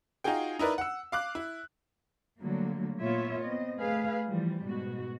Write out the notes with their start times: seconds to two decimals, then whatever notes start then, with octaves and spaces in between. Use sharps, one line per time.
0.24 D#4 F4 F#4 G#4 G5
0.59 D#4 E4 A#4 B4 D5
0.78 F#5 E6
1.12 F5 D6 F#6
1.35 E4
2.39 D3 F#3 G3 A3 A#3
2.99 A#2 A#3 B3 F4 C#5 E5
3.43 B3 C4 D#5
3.77 A3 G#4 B4 F5
4.27 E3 F3 G3
4.66 G#2 B2 F#4